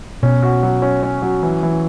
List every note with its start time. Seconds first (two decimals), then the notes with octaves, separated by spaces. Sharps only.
0.23 B2 C#4
0.43 F#4
0.63 F#3
0.82 C#4
1.03 C#4
1.22 F#3
1.43 E3
1.63 E3